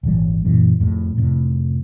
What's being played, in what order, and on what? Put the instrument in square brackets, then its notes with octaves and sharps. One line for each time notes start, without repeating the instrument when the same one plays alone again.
[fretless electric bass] D#1 G#1 E3 G3
F#2 A#2 E3
F2 A2
F2 A2 C3